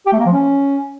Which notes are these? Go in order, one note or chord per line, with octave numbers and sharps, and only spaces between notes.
G4
A3
A#3
F3
C#4